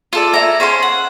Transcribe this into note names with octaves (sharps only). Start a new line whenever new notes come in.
F4 A4 D5
E4 A#5
C#4 C5 F5 C6
F#5